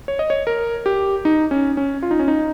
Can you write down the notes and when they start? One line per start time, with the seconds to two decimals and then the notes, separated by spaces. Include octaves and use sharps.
0.08 C#5
0.19 D#5
0.30 C#5
0.47 A#4
0.86 G4
1.25 D#4
1.51 C#4
1.77 C#4
2.03 F4
2.11 D#4
2.19 C#4
2.28 D#4